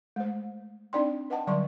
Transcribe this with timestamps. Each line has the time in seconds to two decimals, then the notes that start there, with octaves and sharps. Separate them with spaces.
0.16 G#3 A3 C5
0.93 C4 D4 D#4 D5 G5 C6
1.30 B4 D#5 F#5 G5 A5
1.47 D3 F#3 G3 D5 C6 C#6